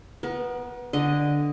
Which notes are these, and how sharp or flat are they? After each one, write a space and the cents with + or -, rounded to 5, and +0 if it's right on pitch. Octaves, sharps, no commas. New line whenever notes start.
B3 -5 A#4 +30
D3 +0 D#5 +0